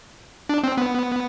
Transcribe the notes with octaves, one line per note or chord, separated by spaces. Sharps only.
D4
C4
B3